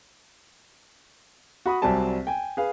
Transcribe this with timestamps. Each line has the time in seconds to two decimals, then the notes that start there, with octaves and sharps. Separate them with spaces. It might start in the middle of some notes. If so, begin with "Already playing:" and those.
1.66 F#4 B5 D#6
1.82 C2 F#3 G3 C4 G#5 A5
2.27 G5 G#5
2.57 G#4 B4 F5